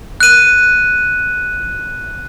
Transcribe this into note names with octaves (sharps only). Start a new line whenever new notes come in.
F#6 D#7